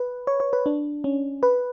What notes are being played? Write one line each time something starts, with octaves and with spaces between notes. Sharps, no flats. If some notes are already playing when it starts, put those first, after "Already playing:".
Already playing: B4
C#5
C#5
B4
D4
C#4
B4